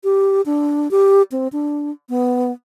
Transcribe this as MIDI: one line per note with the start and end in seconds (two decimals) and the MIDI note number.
0.04 0.41 67
0.46 0.90 62
0.91 1.22 67
1.32 1.48 60
1.52 1.91 62
2.09 2.51 59